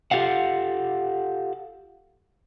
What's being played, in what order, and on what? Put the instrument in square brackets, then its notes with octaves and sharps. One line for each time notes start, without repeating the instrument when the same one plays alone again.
[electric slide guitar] F4 G4 A4 F5 F#5